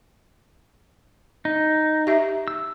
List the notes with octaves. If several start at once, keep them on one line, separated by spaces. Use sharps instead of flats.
D#4
G4 E5
E6